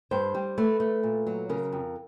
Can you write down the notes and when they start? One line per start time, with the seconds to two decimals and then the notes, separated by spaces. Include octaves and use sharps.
0.11 G2 C5
0.35 G3
0.58 A3 B4
0.80 A3
1.03 A#2
1.27 F#3
1.49 C#3 A#4
1.72 F2